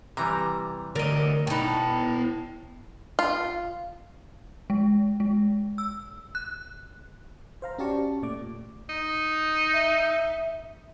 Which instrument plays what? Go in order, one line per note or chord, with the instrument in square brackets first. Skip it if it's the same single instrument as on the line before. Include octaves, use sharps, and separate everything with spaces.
[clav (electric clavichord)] C3 E3 G3 [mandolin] A#5
[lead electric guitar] D2 [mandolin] A#4 D#5 [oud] D5
[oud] B2 B3 [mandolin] D#4 A5 [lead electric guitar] E4 G5
[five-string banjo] F4
[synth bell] G#3
G#3
E6
F#6
[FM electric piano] C5 F5 A#5
C#4 F#4 G4 D5 A5 C#6
A#2 A3 D5 D6
[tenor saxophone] D#4
[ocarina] E5